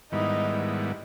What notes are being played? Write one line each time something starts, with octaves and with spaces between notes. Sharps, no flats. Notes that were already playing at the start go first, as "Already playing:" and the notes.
G#2 D#3 G3 B3 D#4 E4